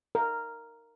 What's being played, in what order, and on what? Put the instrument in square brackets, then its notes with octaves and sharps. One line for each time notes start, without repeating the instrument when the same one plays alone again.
[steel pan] A#4